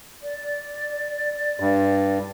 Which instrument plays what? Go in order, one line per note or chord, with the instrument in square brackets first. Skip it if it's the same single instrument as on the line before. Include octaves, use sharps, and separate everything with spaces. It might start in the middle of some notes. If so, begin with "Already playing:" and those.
[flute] D5
[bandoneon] G2